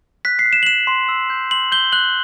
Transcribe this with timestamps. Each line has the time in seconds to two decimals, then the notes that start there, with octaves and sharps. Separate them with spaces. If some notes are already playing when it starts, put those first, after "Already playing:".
0.25 F#6 B6
0.39 C7
0.46 F#6
0.53 E7
0.63 F#7
0.67 F#6 E7
0.87 C6
1.08 E6
1.30 G6
1.51 C6 F#7
1.72 G6 G7
1.92 F#6 F#7